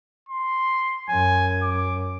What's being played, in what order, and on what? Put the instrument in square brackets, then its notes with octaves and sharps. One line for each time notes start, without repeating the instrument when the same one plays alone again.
[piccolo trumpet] C6
[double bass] F#2 [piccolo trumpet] G#5
[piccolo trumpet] D6